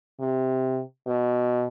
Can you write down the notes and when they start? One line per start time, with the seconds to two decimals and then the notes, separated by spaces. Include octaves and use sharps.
0.20 C3
1.07 B2